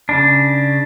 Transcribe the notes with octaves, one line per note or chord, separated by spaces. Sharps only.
C#3 D4